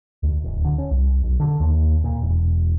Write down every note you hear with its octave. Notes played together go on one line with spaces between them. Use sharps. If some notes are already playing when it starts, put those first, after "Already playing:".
D2
D1
D3
C#4
C2
B1
D3
D#2
A#2
E1